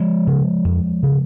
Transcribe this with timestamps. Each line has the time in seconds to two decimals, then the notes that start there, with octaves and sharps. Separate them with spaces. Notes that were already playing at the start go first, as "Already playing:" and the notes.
Already playing: F3 G#3
0.27 C#3
0.65 F2
1.03 C#3